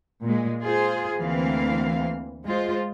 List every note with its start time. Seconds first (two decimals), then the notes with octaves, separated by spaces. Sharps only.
0.23 A#2 G#3
0.63 F4 G#4 C5
1.18 D2 E3 A#3 C4 F5
2.45 G#3 F4 C5